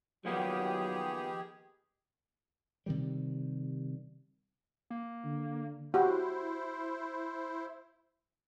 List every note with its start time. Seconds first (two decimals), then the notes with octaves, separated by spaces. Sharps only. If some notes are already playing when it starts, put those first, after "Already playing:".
0.25 D#3 F3 F#3 A#3 B3 G4 G#4
2.86 C3 D#3 G3
4.90 A#3
5.24 D3
5.94 E4 F#4 G4 C5